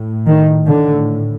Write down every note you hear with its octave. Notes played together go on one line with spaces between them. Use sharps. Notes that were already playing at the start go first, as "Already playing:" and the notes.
Already playing: A2
D#3
A2 D3